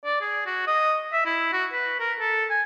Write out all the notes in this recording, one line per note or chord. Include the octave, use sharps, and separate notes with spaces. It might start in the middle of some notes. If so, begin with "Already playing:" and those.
D5
G#4
F#4
D#5
E5
E4
F#4
B4
A#4
A4
G#5